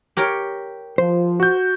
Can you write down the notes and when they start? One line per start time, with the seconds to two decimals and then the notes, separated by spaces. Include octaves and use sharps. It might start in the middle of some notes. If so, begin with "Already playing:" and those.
0.17 G4 A#4 C#5
0.98 F3 C5
1.40 F#4 G6